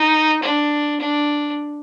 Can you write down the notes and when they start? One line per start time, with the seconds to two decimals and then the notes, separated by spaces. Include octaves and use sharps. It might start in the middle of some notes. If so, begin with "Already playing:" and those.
Already playing: D#4
0.42 D4
1.00 D4